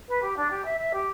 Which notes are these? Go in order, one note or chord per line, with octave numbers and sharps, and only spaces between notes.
B4
G4
D4
G4
E5
E5
G4